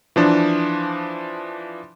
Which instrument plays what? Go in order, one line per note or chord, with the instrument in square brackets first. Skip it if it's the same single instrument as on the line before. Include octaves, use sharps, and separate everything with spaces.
[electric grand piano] E3 F3 D4